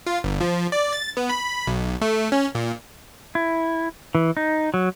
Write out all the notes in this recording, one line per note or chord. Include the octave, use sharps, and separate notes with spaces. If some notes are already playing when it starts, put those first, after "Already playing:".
F4
G1
F3
D5
A6
B3
B5
B1
A3
C#4
A#2
E4
E3
D#4
F#3